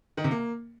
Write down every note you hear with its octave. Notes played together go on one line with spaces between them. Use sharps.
D#3
C3
A#3